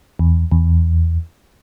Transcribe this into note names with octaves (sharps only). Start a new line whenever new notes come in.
E2
E2